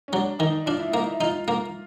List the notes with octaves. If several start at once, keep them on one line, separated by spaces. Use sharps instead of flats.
C#4
F#3 D4
D#3 D#4
D4 F4
E4
A#3 D#4
E4
D#4 F4
A#3